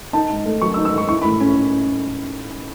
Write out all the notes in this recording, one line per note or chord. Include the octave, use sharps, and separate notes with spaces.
D#4 A5
G#2
A3
F#3 C#6
E6
D#4
E6
G#2 C#6
E4 C#6
B5
A2
C#4